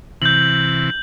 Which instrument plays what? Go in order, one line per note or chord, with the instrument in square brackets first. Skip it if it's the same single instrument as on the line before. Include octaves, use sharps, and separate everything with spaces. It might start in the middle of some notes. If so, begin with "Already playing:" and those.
[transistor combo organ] C3 E3 [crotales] G6 F#7